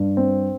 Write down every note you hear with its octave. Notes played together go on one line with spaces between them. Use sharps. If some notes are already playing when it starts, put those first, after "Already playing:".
Already playing: G2
C4